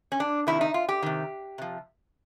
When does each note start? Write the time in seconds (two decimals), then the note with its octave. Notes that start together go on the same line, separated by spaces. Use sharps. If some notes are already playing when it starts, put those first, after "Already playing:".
0.12 C#4
0.20 D4
0.47 C3 D#3 E4
0.61 D#4
0.74 F4
0.89 G4
1.02 C3 D#3
1.58 C3 F3